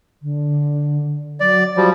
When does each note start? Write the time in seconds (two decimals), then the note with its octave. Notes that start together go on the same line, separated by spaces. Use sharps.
0.22 D3
1.40 F#3 D5
1.77 F3 G3 F#4